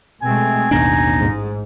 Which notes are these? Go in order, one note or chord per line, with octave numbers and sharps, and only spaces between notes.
B2 G#3 A3 C4 G#5
A1 D#2 B2 D4 D#4
G#2